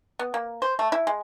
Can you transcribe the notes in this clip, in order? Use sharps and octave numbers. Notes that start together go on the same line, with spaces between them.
B3
A#3
C5
A3
E4
G#3